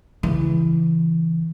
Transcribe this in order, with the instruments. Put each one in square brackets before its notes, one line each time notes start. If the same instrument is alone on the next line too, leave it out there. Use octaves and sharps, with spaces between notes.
[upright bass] C#3 E3